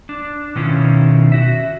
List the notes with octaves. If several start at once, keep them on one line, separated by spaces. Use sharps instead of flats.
D4
B2 D#3 C#4 E4 F4
F#4 E5